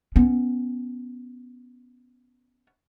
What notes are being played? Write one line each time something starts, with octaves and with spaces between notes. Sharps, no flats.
B3 C#4